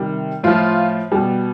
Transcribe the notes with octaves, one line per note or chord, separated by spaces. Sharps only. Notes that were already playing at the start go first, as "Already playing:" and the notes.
Already playing: C3 D#3 G3
A2 F3 F4
B2 G3